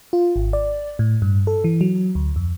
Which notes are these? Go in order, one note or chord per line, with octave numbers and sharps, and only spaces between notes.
F4
G#1
D5
A2
G2
A4
E3
F#3
D2
F2